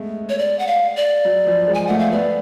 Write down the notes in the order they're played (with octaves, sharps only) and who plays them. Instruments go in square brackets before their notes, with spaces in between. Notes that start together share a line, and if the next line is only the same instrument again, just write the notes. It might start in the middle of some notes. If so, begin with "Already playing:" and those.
Already playing: [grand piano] G#3 A3 B3
[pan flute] C#5
D5
F#5
F5
D5
[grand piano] F#3
F3
G#3
[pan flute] G#5
[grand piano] A3 [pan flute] F#5
[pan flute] F5
[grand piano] B3 [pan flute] D5